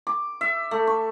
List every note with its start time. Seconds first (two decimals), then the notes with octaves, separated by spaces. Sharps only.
0.07 D6
0.41 E5
0.71 A3
0.87 C#6